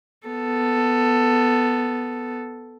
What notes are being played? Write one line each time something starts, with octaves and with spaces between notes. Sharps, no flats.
B3 A4